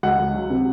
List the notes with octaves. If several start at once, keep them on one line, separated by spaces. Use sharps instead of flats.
C#2 F#5
C#2
F#3
C3